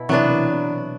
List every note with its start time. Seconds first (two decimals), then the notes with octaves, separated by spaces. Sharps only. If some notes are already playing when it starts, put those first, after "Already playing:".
Already playing: B2 E4
0.09 C3 E3 F#3 B3 D4